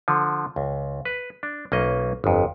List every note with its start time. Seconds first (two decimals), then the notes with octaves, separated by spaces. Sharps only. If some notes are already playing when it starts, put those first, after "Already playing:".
0.08 D3 F3
0.56 C#2
1.05 B4
1.43 D4
1.72 B1 A#3 C#4 D#5
2.24 G1 F2